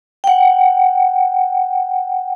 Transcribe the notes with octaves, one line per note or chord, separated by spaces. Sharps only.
F#5 G5